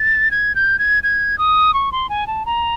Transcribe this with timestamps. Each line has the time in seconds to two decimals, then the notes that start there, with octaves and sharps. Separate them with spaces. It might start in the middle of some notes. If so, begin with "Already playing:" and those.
Already playing: A6
0.31 G#6
0.55 G6
0.79 G#6
1.03 G#6
1.38 D#6
1.74 C#6
1.92 C6
2.09 G#5
2.27 A5
2.46 A#5